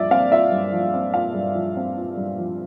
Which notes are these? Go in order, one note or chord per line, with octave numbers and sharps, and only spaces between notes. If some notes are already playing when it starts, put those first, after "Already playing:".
Already playing: G2 F3 D5 E5
C4 F5
F4 E5
G2
F3
C4
F4 F5
G2
F3
C4
F4
G2
F3